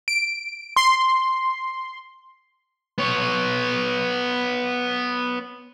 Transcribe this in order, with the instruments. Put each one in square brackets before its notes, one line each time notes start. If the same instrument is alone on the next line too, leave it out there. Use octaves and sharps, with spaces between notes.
[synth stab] D7
C6
[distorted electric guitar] B3 C#5